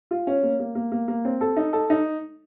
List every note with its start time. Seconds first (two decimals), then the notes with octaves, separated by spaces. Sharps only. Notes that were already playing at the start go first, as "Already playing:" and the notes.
0.11 F4
0.27 C#4
0.43 A#3
0.60 A#3
0.75 A#3
0.92 A#3
1.08 A#3
1.25 C4
1.41 A4
1.56 D#4
1.73 A4
1.90 D#4